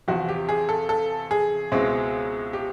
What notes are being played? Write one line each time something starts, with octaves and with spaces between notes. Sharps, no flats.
E2 C3 F3 F#4
G4
G#4
A4
A4
G#4
C#2 B2 G#3 C4 E4
G4